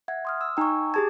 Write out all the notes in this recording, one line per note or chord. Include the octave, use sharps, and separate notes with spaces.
E5 F#5 G#6
C6 D#6 F6
E6
D#4 G5 G#5 C#6 E6
G4 G#4 A5 G#6